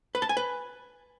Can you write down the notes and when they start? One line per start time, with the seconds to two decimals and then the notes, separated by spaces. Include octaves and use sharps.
0.15 B4
0.22 A5
0.29 G#5
0.37 B4